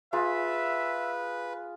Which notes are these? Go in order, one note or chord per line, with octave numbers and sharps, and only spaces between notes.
F4 G#4 B4 E5